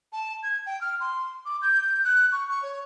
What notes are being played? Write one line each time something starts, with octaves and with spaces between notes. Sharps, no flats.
A5
G#6
G5
F6
C6
D6
G6
F#6
C#6
C#6
C#5